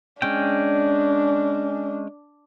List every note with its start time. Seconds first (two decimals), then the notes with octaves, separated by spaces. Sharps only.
0.22 G#3 C#4 D4 G5